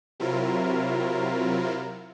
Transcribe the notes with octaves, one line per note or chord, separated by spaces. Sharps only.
C3 F#3 E4 F4 A#4